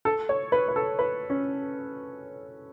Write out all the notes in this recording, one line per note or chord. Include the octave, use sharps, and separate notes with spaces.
A4
C#5
B4
B4
A4
B4
C#4